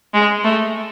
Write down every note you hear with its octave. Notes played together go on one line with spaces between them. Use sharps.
G#3
A3